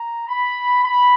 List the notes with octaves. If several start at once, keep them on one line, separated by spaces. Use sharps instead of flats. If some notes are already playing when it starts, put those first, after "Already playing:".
Already playing: A#5
B5
B5